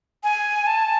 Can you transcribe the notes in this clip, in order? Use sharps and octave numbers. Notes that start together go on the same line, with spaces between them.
G#5
A5